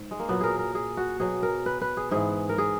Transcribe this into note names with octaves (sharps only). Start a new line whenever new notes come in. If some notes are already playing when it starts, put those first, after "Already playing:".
Already playing: G#2
G#3
A#3
A#2 F#3 B3
G#4 A#4
A#4
G#4
F#4
B2 F#3 G#4
A#4
B4
B4
G#4
G#2 E3 G#4
A#4
G#4